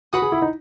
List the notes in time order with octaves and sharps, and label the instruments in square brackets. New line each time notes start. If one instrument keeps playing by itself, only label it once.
[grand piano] F#4 [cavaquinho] B4 F#5 B5 D#6
[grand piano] G#4
E4
D#4